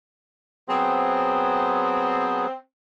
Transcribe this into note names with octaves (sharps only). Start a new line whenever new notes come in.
F#3 B3 C4 G#4